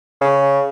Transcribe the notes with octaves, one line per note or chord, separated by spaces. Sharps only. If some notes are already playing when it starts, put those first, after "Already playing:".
C#3